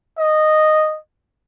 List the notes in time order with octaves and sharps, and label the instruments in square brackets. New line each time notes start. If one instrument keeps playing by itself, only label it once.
[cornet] D#5